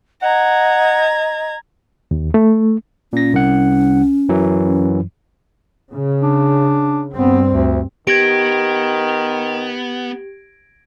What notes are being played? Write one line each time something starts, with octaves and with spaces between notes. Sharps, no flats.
D#5 F#5 A#5 G#6
D#2
A3
A#2 C#4 A#6
C2 F#5
F#2 E3 F#3
C#3
D4
G2 B3 C4
D2
D#3 B3 G4 G#6 A#6 D7